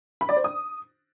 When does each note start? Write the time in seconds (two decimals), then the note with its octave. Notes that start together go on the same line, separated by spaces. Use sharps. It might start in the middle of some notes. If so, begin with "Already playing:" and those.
0.21 B5
0.29 D5
0.37 C5
0.44 D#6